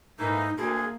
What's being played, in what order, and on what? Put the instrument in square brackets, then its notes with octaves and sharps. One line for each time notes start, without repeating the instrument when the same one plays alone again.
[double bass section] G#2 [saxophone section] E3 A3 A#3 [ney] D#4
[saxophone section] D2 [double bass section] A#3 [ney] G#4